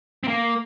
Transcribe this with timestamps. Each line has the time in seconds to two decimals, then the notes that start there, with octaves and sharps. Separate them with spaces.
0.24 C4
0.28 A#3